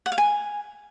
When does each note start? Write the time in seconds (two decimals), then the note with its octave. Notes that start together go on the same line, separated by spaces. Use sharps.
0.06 F#5
0.12 F5
0.18 G#5